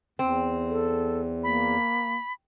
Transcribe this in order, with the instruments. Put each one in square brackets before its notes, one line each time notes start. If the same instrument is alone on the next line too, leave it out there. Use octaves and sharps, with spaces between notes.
[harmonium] E2 [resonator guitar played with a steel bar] C4
[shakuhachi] A4
[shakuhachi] A#3 [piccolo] B5